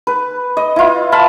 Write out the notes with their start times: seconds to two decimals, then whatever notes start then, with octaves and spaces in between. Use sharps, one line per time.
0.07 B4
0.57 D#5
0.76 E4 F4
1.12 F5 A5 B5